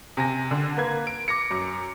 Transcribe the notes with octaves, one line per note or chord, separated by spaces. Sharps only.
C3 G#5 A#6
D3
A#3 B4 G#6
D7
D6 A#6 C#7
F#2